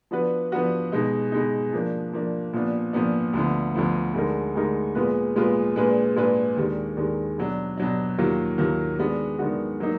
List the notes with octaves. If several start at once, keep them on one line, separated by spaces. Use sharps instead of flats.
F3 B3 D4 F#4 B4
F3 B3 D4 F#4 B4
B2 G#3 D#4
B2 G#3 D#4
F3 A#3 D4
F3 A#3 D4
A#2 F3 B3 D4
A#2 F3 B3 D4
D2 D3 F3 B3
D2 D3 F3 B3
D2 D3 G#3 D#4 A#4
D2 D3 G#3 D#4 A#4
A#2 G#3 B3 F4 B4
A#2 G#3 B3 F4 B4
A#2 G#3 D4 G#4 B4
A#2 G#3 D4 G#4 B4
D#2 D#3 G#3 D4
D#2 D#3 G#3 D4
B2 F#3 D4
B2 F#3 D4
D#2 D#3 F#3 A#3 F4
D#2 D#3 F#3 A#3 F4
D#3 G#3 B3 D4 F#4
D#3 G#3 B3 D4 F#4
F#3 A#3 D#4